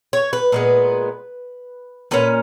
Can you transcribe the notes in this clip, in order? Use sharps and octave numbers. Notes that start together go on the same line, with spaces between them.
C#5
B4
A#2 G#3 B3
A#2 A#3 C#4 B4